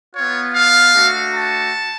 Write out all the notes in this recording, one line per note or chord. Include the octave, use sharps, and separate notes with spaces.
B3 F4 C#5
F5
A3 D4 F#4
A5